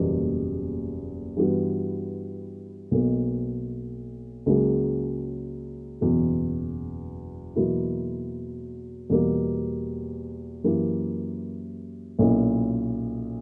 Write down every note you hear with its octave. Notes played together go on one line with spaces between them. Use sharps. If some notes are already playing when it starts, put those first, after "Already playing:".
Already playing: F#1 E2 B2 G3 A#3
G2 E3 G3 B3 F#4
B1 B2 A#3
C#2 C#3 F#3 A#3 C#4
F#1 E2 B2 F#3
E2 B2 F#3 A#3 E4
E2 B2 G3 A#3
F#2 E3 A#3 E4 G4
B1 A#2 A#3 C#4 E4